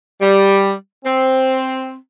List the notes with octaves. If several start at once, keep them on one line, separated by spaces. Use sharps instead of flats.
G3
C4